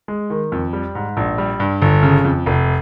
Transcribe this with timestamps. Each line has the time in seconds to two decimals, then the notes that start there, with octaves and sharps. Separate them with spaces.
0.08 G#3
0.30 D#3
0.52 F2
0.73 G3
0.95 G#2
1.17 A#1
1.38 G3
1.60 G2
1.82 G1
2.03 C#3
2.25 F2
2.46 F1